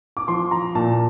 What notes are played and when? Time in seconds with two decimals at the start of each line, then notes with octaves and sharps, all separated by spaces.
0.17 D6
0.28 F3 C6
0.51 A#5
0.75 A#2 A5